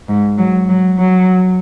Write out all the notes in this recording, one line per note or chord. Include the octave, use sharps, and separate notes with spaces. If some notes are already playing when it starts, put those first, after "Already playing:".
G#2
F#3
F#3
F#3